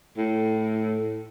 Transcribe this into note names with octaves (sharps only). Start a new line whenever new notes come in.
A2